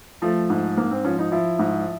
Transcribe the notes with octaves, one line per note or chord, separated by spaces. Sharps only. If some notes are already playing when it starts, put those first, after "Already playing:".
F3 A3
G#2
G#2 A#3
C4
F3 C#4
D#4
F3 E4
G#2